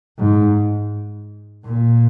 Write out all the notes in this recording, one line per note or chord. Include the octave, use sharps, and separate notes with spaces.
G#2
A#2